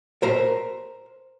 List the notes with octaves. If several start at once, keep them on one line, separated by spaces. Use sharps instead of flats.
A#4 C5 A#5